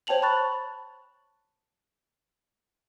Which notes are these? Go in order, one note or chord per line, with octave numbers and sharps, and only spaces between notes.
C5 C#5 G5 A5 F7 F#7
A5 B5 C#6 F#6 A6